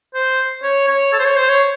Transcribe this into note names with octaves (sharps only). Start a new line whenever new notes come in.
C5
C#5
C#5
A4
C5
C#5
C5
C#5